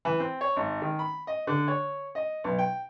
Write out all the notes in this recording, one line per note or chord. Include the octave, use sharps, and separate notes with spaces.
E3
C4
C#5
G#1
D#3
B5
D#5
D3
C#5
D#5
B1
G5